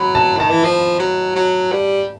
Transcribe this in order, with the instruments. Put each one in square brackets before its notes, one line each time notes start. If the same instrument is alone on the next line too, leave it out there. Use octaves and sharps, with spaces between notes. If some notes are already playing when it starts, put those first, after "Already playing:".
Already playing: [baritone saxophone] F#3 [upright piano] B5
[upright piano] A5
[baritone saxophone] D#3 [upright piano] A5
[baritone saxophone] E3
F3
F#3
F#3
G3